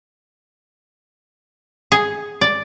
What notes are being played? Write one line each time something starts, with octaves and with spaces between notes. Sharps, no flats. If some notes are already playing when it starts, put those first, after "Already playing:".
G#4
D5